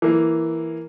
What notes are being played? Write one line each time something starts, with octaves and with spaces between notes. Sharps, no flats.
E3 A#3